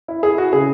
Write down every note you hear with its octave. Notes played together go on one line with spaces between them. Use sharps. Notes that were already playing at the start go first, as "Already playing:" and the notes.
E4
E4 G#4
E4 F#4
C#3 G#4